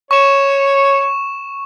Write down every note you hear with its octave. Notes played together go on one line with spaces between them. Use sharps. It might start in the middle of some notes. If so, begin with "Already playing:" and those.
C#5 C#6 E7